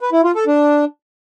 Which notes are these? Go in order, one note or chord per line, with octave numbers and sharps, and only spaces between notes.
B4
E4
F4
A4
D4